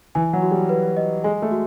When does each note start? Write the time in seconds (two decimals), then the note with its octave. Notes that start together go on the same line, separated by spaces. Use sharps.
0.15 E3 G#5
0.33 F#3
0.42 F#4
0.51 G3
0.69 B4
0.97 D#5
1.24 G#3 G#5
1.42 A3
1.51 F#4